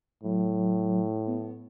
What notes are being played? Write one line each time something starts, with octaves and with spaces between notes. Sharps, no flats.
A2 F#3
B3